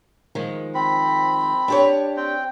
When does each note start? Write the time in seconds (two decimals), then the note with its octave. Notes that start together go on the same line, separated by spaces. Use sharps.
0.35 D#3 F3 G#3
0.75 C4 B5
1.68 D4 G4 C#5
2.17 C4 G5